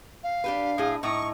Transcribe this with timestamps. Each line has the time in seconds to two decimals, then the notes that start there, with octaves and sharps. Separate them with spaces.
0.23 F5
0.44 D4 G4 B4
0.78 A2 G#4
1.03 A2 D#4 D#5 C#6